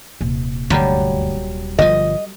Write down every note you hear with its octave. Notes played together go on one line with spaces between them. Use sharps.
D#1 C3
D2 G2 D3 F#3 G3
G1 B2 F3 D#5